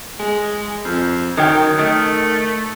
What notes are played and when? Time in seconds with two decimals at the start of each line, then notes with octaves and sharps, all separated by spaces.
0.20 G#3
0.85 F2
1.37 D#3 F#3 G5
1.79 D#3 A3